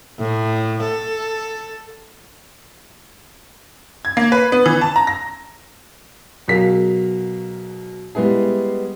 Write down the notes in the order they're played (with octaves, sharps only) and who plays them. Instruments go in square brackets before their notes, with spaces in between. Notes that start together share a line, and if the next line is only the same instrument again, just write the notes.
[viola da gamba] A2
A4
[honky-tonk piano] G#6
A#3
B4
B3
E3
A5
A#5
A#6
[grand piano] B2 F#3 G#4 A#4 F5 B6
G3 G#3 B3 E4 G#4